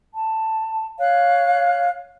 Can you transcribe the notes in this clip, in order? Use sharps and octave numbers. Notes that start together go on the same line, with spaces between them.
A5
C#5 F5 F#6